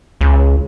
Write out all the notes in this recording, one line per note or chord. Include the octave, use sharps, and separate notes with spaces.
C#2